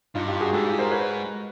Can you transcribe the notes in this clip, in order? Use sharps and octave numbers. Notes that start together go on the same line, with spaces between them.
G2 D#4 F4
F4 G4
F#4 G#4
G#2 G4 A4
F4 G4
A#4 C5
B4 C#5